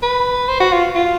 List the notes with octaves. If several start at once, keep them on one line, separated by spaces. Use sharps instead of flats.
B4
C5
F#4
F4
F4